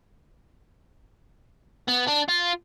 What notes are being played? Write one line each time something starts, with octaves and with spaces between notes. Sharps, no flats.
B3
D4
F4